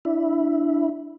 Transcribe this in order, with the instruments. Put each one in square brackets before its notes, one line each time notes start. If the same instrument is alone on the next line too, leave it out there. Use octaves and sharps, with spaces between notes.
[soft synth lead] D4 [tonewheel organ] E4